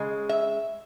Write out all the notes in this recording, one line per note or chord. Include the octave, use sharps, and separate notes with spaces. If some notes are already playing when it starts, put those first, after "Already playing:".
Already playing: C#3 G#3
E5